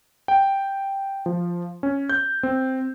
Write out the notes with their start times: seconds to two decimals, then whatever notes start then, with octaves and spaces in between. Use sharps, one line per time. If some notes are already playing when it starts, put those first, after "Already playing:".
0.28 G5
1.26 F3
1.83 C#4
2.09 G6
2.43 C4